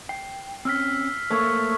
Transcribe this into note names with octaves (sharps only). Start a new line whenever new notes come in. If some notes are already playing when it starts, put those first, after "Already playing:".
G5 C7
C4 C#4 E6 F6 B6
A3 A#3 A#4 C5 C#5